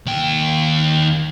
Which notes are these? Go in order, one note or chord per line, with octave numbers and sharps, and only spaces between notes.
D#2 G5